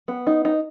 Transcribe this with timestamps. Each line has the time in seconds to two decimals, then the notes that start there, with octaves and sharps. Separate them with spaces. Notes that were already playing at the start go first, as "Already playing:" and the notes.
0.08 B3
0.27 D#4
0.45 D#4